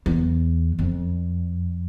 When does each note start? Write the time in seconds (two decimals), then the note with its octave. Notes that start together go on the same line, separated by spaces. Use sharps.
0.06 E2
0.79 F2